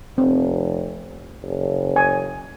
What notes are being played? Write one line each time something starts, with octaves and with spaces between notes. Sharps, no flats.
F1 C4
F#1
G#5